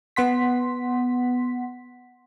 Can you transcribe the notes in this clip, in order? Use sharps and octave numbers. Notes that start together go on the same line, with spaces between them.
B3 F#5 C6 B6